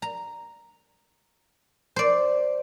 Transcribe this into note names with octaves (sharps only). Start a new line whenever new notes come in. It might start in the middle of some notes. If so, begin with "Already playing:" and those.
A#5
C5 D5